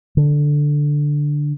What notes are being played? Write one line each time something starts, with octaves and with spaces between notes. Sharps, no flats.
D3